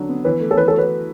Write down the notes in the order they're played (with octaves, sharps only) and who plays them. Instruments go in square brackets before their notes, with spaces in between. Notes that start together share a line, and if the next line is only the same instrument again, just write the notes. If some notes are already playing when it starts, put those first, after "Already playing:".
Already playing: [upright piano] D3 F#3 D4
B3
[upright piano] E3 [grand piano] B4
[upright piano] A3
[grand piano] A4
[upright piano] E3 [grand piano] B4
[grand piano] A4
[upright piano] F#4 [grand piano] B4